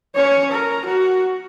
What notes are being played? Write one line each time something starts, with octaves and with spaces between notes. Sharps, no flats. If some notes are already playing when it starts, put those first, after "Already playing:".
C#4 C#5
A#4
F#4